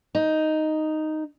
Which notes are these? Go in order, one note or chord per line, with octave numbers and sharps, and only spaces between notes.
D#4